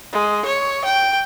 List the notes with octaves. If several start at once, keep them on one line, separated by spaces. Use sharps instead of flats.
G#3
C#5
G5